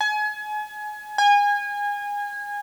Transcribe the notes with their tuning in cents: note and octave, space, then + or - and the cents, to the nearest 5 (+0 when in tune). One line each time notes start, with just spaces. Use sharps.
G#5 +30
G#5 -25